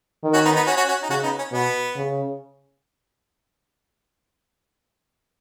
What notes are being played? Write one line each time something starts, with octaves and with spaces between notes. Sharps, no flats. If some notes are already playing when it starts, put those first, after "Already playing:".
D#3
C#4 F#4
B3 D#4
B3 D#4
C#4 F#4
C#4 F#4
C#4 F#4
D#4
C#3 C#4 F#4
B3 D#4
C#4
B2 B3
C#3